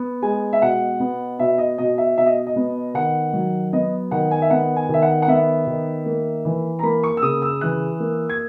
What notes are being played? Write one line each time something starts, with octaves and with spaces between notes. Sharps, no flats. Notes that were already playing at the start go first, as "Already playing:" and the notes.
Already playing: B3
G#3 G#5
E5
B2 F#5
B3
B2 E5
D#5
B2 D#5
E5
B2 E5
D#5
D#5
B3
D#3 F#5
F#3
B3 D#5
D#3 F#5
G#5
E5
B3 F#5
G#5
D#3 E5
F#5
F#5
B3 E5
D#3
A#3
E3
A#5
A#3 B5
C#6
E6
C#3 D#6
E6
E3 F#6
A#3
G#6